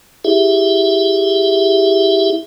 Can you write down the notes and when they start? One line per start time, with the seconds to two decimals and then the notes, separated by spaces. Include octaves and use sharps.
0.25 E4 G4 G#4 E5